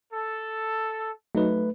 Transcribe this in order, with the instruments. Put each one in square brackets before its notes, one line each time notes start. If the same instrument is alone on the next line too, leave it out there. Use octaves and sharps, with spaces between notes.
[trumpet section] A4
[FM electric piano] F#3 D#4 [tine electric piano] A3 B4